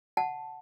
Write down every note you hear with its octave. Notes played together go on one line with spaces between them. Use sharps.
F#5 A5